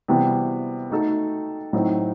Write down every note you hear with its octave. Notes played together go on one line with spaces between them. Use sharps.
C3 E3 G3 B3 F#4
A3 D#4 F#4 A4
A2 F#3 C4 D#4